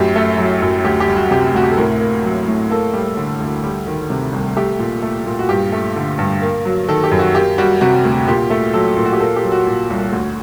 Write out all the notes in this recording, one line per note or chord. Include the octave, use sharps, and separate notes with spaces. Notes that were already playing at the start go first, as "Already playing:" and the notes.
Already playing: F#2 A2 G4
A3
F#3
F#2
D2 G4
G4
G3
F#4
C3 G4
D2 F#4
G4
A4
A2 A#4
A#3
F#3
A2
A#3 A4
G3
D3
D2
G3
D#3
C3
C2
A3 G4
A#2
A3
A#2
F#4
G2 G4
A3
D3
G2
A#3
F#3
D#3 A4
G4
F#2
F#4
A#3 G4
G3 F#4
C3 F#4
D2
A#2 G4
A3
F#3 A4
A#2
F#4
G4
A#3 A4
G4
F#3
F#4
A#2
C2
D2